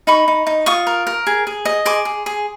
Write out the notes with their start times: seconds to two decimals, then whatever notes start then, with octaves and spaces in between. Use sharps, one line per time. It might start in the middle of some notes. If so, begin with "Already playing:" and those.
0.07 D#4 B5 C#6
0.28 D#4
0.47 D#4
0.66 F4 C#6 D#6
0.87 A#4
1.07 A#4
1.27 G#4
1.47 G#4
1.65 D#5
1.85 G#4 C6 D6
2.05 G#4
2.26 G#4